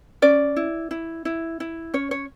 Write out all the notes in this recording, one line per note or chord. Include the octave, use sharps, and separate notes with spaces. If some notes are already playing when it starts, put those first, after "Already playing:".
C#4 D5
E4
E4
E4
E4
C#4 C#5
C#5